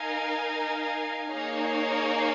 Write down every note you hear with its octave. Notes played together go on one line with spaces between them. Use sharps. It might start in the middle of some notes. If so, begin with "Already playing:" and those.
Already playing: D#4 A#4 F5 G#5
A#3 D#4 G#4 C#5 F5